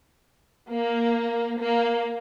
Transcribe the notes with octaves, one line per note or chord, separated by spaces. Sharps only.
A#3
A#3